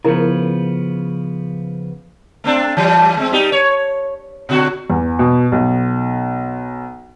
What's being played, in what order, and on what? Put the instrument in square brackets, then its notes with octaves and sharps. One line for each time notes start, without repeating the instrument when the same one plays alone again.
[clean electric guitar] C#3 F3 B3 [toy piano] E4 A#4
[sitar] A3 C4 D4
E3 G3
G#3 C4
G3 D#4 G4
C#5
B2 D3 F#4
[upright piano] E2
B2
B1